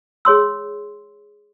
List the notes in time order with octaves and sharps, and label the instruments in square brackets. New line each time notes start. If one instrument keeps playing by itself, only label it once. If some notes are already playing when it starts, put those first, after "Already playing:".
[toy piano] G#4 C#5 C6 E6